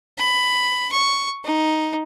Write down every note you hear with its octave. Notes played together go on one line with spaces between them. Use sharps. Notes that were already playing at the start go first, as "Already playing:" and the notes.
B5
C#6
D#4